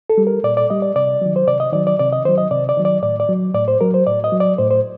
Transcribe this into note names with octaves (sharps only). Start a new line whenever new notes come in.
A4
G3
A#4
A#2 D5
D5
G3 D#5
D5
C3 D5
D#3 F#3
C5
C3 D5
D#5
D#3 F#3 D5
D5
C3 D5
D#5
D#3 F#3 C5
D#5
C3 D5
D5
D#3 F#3
D5
A2 D5
D5
F#3
A2 D5
C5
F#3 A#4
C5
A2 D5
D#5
F#3
D5
A2 C5
C5